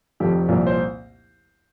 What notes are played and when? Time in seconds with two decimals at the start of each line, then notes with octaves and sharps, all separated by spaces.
0.20 F1 F2 F3 G4
0.48 C2 A#2 F3
0.67 C5